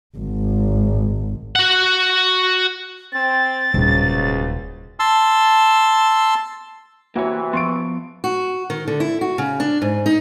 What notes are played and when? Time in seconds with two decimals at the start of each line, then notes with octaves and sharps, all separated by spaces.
0.16 G#1
1.56 F#4 F#5
3.13 C4 A6
3.74 D#1 C#2 G#2 C#3 F#3
5.00 A5 C6 E6
7.16 C3 E3 A#3 F#4 B4 C#5
7.53 F3 B3 C6 C#6 D7
8.24 F#4
8.70 D#3
8.88 D3
9.00 E4
9.21 F#4
9.38 C#3
9.60 D4
9.82 G#2
10.06 D#4